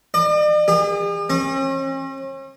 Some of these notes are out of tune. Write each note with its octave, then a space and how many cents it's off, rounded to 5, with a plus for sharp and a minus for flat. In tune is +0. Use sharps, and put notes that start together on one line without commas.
D5 +45
G#4 -45
C#4 -45